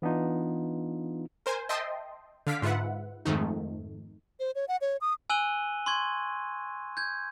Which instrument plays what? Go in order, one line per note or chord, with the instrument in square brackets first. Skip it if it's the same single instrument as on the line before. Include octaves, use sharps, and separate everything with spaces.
[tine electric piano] E3 B3 D4 D#4 F4
[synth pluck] A#4 C5 G#5
D#5 E5 G5 A5 C6 D#6
D3 F5 B6 D7
G#2 F4 B4 E5 F#5
F2 G#2 D#3 A3 D#4
[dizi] C5
C#5
F#5
C#5
D#6
[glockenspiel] G#5 E6 F#6 D#7 F#7 G7
C6 C#6 G#6
G6 G#6